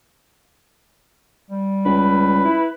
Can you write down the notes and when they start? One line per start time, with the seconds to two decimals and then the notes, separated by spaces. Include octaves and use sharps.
1.50 G3
1.86 C#2 B4
2.45 E4